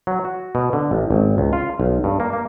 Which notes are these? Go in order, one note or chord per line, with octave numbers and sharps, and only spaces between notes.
F#3
F#4
B2
D3
A1
G#1
C#2
F4
B1
G2
A#3
A#3